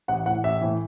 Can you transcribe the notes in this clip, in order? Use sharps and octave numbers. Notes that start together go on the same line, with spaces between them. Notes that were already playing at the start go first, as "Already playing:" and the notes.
A1 F#5
A2 E3 F#5
A1 E5
A2 E3